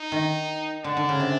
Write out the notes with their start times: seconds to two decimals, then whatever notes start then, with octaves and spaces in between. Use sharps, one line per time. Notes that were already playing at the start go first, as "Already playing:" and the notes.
Already playing: D#4
0.12 D#3
0.84 D3 D4
0.97 D3
1.09 C#3
1.20 C3